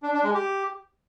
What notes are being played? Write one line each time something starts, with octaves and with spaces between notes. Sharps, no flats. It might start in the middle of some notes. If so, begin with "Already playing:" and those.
D4
D4
G#3
G4